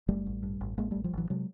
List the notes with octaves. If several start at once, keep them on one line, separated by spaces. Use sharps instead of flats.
F#1 G3 A3
A1
G2
A1
A1 G#3 A#3
A1 G3 A3
F3 G3
A1 E3 F#3
C3 F#3 G#3